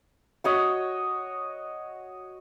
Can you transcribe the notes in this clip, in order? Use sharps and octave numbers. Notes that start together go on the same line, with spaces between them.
F#4 C#5 D#5